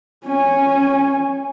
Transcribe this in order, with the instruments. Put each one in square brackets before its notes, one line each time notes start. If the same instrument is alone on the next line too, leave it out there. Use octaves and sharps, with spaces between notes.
[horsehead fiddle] C#4 G#5